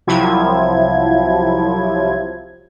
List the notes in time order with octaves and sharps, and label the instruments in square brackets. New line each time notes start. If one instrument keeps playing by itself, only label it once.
[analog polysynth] C2 C3 F3 F#3 E4 G#6